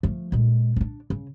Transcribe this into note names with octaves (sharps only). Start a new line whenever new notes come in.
F3 A3
A#2 G#3
C#4 D4
C#3